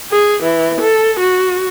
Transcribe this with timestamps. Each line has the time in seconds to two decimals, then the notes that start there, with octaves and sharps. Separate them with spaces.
0.12 G#4
0.44 E3
0.82 A4
1.21 F#4